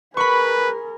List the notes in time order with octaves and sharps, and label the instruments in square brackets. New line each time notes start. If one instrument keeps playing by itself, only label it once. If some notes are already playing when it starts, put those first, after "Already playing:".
[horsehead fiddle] G#4 A#4 [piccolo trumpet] B4 [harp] B5 C#6